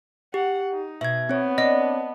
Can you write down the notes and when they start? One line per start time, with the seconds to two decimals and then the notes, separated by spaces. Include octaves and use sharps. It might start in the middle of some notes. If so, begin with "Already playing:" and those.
0.34 G4 F#5
0.72 D#4
1.01 B2 E5 G#6
1.29 B3 C4 C#5
1.58 D4 D#5